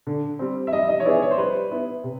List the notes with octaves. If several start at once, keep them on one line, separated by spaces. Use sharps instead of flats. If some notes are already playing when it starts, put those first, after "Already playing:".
D3
G3 C4
E5
G3 D#5
D#5
C#5
B3 E4 G#4 D5
C#5
C5
G3 B4
B3 E4
C3